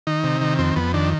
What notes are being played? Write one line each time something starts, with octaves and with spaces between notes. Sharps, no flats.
D#3 D#4
C3
D#3
F2 C4
F2 B3
D#3 D4